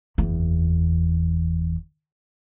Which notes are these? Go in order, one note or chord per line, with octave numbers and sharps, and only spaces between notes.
F#1 E2